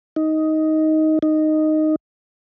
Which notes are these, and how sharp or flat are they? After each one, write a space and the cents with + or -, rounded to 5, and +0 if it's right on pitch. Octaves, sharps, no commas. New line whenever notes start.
D#4 +10
D#4 -5